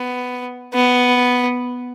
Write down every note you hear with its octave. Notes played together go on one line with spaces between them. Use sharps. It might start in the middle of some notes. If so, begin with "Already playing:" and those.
Already playing: B3
B3